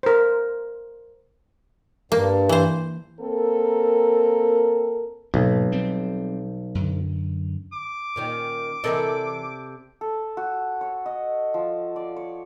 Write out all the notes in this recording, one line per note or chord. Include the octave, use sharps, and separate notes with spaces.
A#4 C5
G2 A#3
E3 C5
A#3 C4 A4 A#4
B1 G#2 B2 A#3
G3 C4
F#2 D3
D6
A#2 D#3 C#4
C3 E3 A4 A#4 D5 D#5
A4
F#4
C#5
D#5
F3
D5
C#5